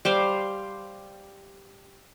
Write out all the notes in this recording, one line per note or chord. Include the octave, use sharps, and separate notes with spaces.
G3 C5 F5